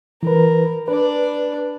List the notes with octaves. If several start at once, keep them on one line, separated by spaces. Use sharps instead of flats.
E3 A#4 B4
D4 B4 D5